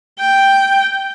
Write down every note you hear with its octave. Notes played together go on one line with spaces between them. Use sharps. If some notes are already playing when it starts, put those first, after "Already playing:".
G5